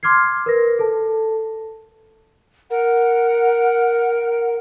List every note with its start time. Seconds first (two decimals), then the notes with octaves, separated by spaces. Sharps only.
0.03 C6 D6 F6 G#6 C7
0.46 A#4 B4 A#6
0.79 A4 A5
2.70 A#4 F#5